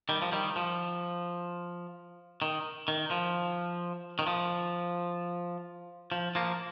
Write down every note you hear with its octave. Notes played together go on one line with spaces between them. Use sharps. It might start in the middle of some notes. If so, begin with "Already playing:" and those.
D#3 G3
F3
D#3 G3
F3
D#3
D#3
F3
D#3
F3
F3
F3 A#3